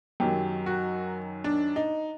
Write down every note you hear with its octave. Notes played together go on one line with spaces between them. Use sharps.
F#2 D#3 F#3 G4
F#4
D4
D#4